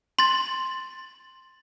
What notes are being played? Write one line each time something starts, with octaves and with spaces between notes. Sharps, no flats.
C6 A6